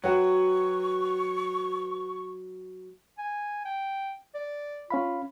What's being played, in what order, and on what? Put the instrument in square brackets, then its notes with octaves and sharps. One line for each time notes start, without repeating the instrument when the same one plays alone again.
[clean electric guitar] F#3 [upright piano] F#4 B4 F#5 [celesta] C#5 G5 [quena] C#6
[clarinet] G#5
G5
D5
[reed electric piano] C#4 F5 B5 [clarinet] F4